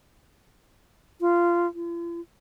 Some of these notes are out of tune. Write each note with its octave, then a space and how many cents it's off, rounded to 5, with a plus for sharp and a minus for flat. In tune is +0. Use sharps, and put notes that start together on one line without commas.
F4 -15
F4 -45